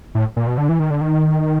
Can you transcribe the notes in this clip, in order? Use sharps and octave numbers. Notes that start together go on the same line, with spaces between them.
A2
A#2
B2
D3
E3
D#3
D3
D#3